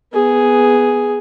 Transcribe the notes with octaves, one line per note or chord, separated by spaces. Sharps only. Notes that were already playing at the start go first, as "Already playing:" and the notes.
B3 G#4